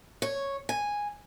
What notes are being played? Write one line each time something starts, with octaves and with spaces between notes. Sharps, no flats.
C#5
G#5